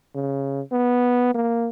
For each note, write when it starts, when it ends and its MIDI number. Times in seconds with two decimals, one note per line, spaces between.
0.15 0.61 49
0.72 1.34 59
1.34 1.70 58